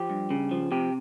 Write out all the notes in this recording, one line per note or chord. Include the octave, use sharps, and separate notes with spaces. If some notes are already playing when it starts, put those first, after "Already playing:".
Already playing: F3 G4
G2
C#3
F3
C3 G4